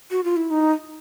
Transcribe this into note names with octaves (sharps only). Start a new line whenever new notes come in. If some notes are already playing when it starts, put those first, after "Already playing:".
F#4
F4
E4
D#4